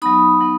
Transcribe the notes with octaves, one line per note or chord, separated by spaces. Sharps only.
F#3 B3 D#4 B5 D#6
F#3 B3 D#4